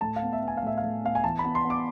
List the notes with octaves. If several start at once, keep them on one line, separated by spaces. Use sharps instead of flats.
A2 A5
F5
B3
E5
B3
G#5
F5
A2 E5
F5
A2
B3 F5
G#5
E3 A5
B5
B3
C6
B3
D6